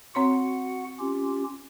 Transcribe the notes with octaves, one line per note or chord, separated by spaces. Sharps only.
C4 F#4 C#5 F#5 C6
C#4 F4 G4